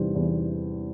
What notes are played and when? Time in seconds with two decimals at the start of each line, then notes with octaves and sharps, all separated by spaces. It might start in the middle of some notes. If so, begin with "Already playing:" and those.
Already playing: E2 C3 E3 G3 C4
0.15 E2